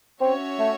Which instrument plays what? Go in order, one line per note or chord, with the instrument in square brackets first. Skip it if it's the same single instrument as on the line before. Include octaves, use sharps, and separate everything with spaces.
[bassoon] C4 [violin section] C#4 F#4 C#5 E5
[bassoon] A3